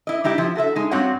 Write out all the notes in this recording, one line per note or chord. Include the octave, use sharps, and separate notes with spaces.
E4 D#5
G3 D#4 E4 G4
F3 E4
F#4 A4 D#5 E5
G#3 D#4
G2 F#3 C4 F#4 C#5 F#5